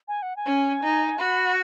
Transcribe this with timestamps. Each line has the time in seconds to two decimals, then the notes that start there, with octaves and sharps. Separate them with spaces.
0.08 G#5
0.22 F#5
0.36 G#5
0.46 C#4
0.83 D#4
1.19 F#4 B5